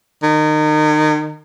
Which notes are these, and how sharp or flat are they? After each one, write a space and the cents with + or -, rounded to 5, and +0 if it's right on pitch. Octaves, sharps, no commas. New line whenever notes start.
D#3 -30